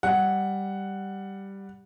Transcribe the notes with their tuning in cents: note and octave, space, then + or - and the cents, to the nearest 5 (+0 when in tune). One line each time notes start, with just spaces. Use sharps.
G3 +0 F#5 +0